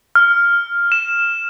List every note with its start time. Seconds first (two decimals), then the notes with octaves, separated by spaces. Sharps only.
0.15 F6
0.92 E7